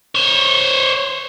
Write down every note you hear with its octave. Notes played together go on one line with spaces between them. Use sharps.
C5 C#5